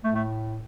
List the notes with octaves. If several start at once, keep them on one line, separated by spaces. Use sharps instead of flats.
A2 A3
A3